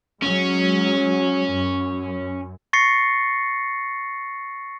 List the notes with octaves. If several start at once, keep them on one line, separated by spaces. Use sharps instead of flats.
F#3 G#3 C#4
F#2
C#6 A6 A#6 C7 C#7